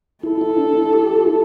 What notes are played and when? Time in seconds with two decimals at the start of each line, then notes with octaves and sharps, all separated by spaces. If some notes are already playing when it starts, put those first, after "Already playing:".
0.23 E4 A4
0.41 E4
0.58 D4
0.75 E4
0.93 G4
1.16 F4
1.27 E4